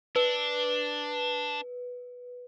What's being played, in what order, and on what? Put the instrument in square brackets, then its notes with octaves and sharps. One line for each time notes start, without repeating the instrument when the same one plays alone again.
[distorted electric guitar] D4 [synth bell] B4